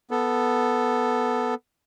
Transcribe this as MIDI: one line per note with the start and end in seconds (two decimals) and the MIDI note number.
0.11 1.54 59
0.11 1.54 69